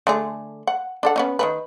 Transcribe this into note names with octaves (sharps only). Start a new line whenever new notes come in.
D3 A3 G#4
F#5
D4 A4 F#5
B3 C#4 D#4
D#3 E3 B4